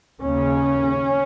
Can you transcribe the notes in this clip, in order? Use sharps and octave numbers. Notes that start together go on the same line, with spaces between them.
D#2 C#3 C#4